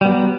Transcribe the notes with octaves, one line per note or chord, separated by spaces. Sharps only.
F#3 G3 B3